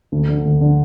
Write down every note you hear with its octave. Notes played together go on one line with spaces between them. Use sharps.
D2
D3
D2
D3